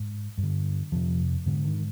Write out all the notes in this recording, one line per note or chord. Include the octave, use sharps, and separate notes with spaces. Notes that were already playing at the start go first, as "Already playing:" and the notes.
Already playing: G#2
G2
D3
F2 C3 F3
G#2 D3
D#3